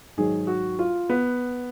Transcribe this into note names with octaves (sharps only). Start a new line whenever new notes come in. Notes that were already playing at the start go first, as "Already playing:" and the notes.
G#2 D#3 F#3 G#4
F#4
F4
B3